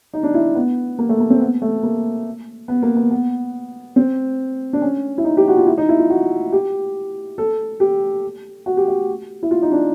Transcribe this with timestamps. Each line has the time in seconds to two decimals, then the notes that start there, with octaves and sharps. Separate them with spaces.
0.14 D#4
0.23 D4
0.34 E4
0.55 B3
0.99 A#3
1.09 A3
1.20 A#3
1.30 C4
1.40 B3
1.62 A3
1.83 A#3
2.68 B3
2.83 A#3
2.96 B3
3.11 B3
3.96 C4
4.73 D4
4.82 C#4
5.18 E4
5.24 D#4
5.37 G4
5.48 F#4
5.57 F4
5.67 E4
5.78 D#4
5.89 E4
5.99 F4
6.10 F#4
6.52 G4
7.38 A4
7.80 G4
8.66 F#4
8.77 G4
8.88 F#4
9.43 E4
9.51 F4
9.62 D#4
9.72 D4